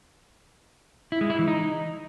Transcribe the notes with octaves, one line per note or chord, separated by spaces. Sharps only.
E4
G#3
E4
E3
D#4